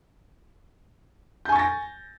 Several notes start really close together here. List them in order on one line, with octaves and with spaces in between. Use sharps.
G6 G#5 C#6 A6 A#6